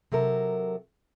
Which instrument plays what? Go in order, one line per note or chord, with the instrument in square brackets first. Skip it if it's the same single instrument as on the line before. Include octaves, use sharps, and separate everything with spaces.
[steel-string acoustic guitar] C3 F#3 A4 A#4